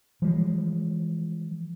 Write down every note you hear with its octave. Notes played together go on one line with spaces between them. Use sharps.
E3 F3 G3 G#3